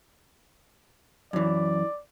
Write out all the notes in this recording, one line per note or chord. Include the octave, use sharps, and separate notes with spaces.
F#2 E3 D5